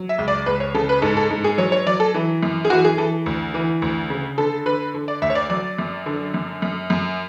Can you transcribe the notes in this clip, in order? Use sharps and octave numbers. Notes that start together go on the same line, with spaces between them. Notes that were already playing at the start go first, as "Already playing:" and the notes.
Already playing: F#3
E5
C#2
D5
C#2 B4
C#5
C#3 A4
B4
G#2 A4
A4
G#2
G#4
F#3 C#5
C#5
F#3 D5
A4
E3
F#2
G#4
E3 F#4
G#4
E3 A4
D2
E3
D2
C#3
D3 A4
D3 B4
D3
D5
D2 E5
C#5
D5
F#3 D5
F#2
D3
F#2
F#2
F#2